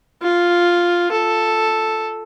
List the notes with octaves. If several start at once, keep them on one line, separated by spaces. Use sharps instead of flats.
F4
A4